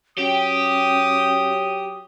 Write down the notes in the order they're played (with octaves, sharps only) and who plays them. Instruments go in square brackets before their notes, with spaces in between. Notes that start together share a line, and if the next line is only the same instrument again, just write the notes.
[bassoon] F#3 [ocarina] C#4 [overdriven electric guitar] G4 [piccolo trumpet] D#6